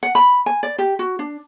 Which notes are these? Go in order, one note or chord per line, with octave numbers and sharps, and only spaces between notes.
F#5
B5
G#5
D5
G4
F#4
D4